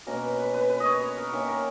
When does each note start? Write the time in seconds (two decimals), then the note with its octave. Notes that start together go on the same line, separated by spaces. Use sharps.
0.07 B2 A#3 C#4 A#4
0.22 B4
0.38 B4
0.54 B4
0.70 B4
0.80 D#5
0.85 C#5
1.01 C#5
1.17 A#4
1.33 D#3 A#3 C#4 E5
1.48 A#4